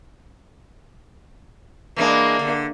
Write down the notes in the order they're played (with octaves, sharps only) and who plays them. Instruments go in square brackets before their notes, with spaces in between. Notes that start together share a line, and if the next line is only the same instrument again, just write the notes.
[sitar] E3 G#3 D4 [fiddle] A#3
[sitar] D3